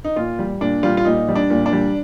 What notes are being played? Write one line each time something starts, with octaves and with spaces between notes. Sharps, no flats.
D#4
A#2 F4
G3
A#2 D4
G3 F4
F4
A#2 D#4
G3
D4
A#2
D4
G3